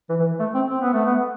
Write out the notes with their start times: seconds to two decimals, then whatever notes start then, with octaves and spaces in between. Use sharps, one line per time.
0.09 E3
0.19 E3
0.39 A3
0.54 C4
0.69 C4
0.81 B3
0.93 A3
1.06 B3